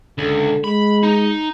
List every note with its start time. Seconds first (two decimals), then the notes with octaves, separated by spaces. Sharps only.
0.18 C#2 D3
0.64 G#3 B5
1.03 D#4